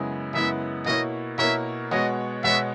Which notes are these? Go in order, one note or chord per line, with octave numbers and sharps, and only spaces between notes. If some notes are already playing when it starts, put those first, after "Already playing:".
Already playing: F#2 C#3 G#3 B3 E4
F#2 C#3 G#3 B3 E4 E5
B2 A#3 E4 A#4 C#5 D#5
B2 A#3 E4 A#4 C#5 E5
B2 G#3 B3 F#4 C#5 D#5
B2 G#3 B3 F#4 C#5 E5